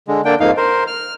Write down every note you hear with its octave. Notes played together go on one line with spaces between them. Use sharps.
D3 G#3
D3 A#3 D4 G5
F2 G#2 A#3 D#4 F5
A#4 C5
F6